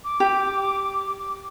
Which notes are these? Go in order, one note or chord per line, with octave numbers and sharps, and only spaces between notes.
D6
G4